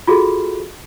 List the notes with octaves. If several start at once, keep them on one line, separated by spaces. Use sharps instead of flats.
F4 F#4 G#4 A4